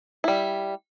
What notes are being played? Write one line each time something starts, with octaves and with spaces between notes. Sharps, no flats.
G3 E4